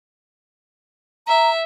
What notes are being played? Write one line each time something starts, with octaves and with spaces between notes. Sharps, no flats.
E5 A#5